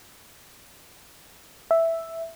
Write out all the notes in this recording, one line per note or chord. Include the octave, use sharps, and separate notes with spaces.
E5